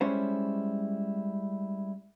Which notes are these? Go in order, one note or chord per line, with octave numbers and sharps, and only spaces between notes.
G3 G#3 C#4 E4 C5